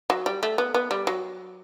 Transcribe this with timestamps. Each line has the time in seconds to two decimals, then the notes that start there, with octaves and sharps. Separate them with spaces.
0.10 F#3
0.26 G3
0.43 A3
0.58 B3
0.74 B3
0.91 G3
1.07 F#3